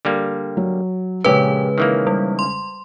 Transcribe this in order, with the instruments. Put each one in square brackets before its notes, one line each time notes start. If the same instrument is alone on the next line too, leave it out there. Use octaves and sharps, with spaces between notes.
[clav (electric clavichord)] D3 G3 A#3
[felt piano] F#3
[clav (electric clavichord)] A#1 G4 [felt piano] C#3 G#3 C#4 [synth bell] B4
[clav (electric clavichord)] D#3 E3 A#3
[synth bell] G3
C6